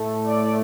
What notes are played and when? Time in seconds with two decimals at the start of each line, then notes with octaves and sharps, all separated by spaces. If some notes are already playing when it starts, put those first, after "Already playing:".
Already playing: A2 A3
0.26 D5